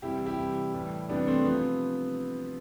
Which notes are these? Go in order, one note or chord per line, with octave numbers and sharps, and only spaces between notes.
C3 E3 G3 E4 G4
E4 G4
C3 E3 G3
A2 E3 G3
C3 E3 G3 B3 D4
A3 C4
C3 F3 B3